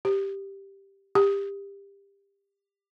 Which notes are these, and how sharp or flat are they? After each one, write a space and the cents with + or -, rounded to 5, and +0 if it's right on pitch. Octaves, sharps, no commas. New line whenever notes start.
G4 +0
G4 +25